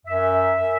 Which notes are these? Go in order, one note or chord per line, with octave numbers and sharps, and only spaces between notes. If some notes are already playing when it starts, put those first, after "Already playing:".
F#2 E5
F#2